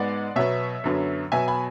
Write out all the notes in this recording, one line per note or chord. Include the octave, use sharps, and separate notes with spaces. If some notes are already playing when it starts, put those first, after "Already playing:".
Already playing: G#2 G#3 B3 D5 F#5
B2 F#3 B3 C#5 E5
F#2 D3 F#3 B3
B2 F#3 B3 E5 G#5
G#5 B5